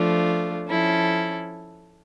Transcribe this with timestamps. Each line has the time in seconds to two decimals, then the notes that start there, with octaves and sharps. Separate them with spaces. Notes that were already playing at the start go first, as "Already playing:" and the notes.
Already playing: F3 A3 D4 F4
0.69 F3 C#4 E4 A4